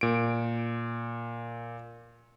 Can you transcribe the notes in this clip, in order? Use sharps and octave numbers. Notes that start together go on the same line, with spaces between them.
A#2 D7